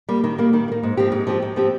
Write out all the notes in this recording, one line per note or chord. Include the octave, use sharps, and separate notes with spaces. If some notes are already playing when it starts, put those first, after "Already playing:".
G3 A#3
D#3
G3 A#3
D#3
G3
A#3
G#2
F3 C4 G4
G#2
F3 C4 G4
G#2
F3 C4 G4